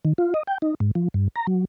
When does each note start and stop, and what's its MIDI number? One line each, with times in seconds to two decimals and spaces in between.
0.05 0.13 51
0.18 0.34 65
0.34 0.43 75
0.47 0.58 79
0.62 0.75 63
0.80 0.91 44
0.95 1.08 53
1.14 1.28 43
1.36 1.47 82
1.47 1.65 54